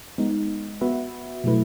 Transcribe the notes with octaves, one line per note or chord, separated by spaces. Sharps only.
G#3 B3 D#4
B3 F#4 B4 E5
B2 F#3 A3 E4 B4